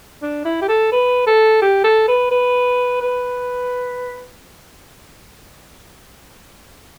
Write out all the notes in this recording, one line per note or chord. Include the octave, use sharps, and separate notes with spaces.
D4
E4
G4
A4
B4
A4
G4
A4
B4
B4
B4